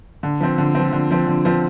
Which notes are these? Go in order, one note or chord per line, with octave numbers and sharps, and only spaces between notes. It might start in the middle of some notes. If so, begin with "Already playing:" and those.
D3
F3 C4
D3
F3 C4
D3
F3 C4
D3
F3 C4